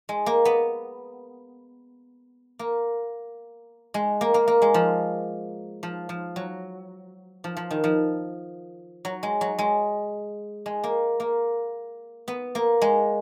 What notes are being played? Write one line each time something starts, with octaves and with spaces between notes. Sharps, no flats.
G#3
A#3
B3
A#3
G#3
A#3
A#3
A#3
G#3
F3
F3
F3
F#3
F3
F3
D#3
F3
F#3
G#3
F#3
G#3
G#3
A#3
A#3
B3
A#3
G#3